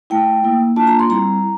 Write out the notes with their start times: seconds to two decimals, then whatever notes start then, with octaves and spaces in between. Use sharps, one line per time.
0.10 A3 E4 G5
0.44 A#3 E4
0.76 A#3 D4 F4 A5
0.87 A#5
0.99 C6
1.09 G3 C4 E4 A#5